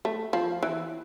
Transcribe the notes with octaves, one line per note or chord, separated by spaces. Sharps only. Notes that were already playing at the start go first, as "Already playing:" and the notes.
A3
F3
E3